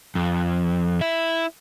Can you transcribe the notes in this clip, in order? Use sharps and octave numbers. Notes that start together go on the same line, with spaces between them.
F2
E4 E5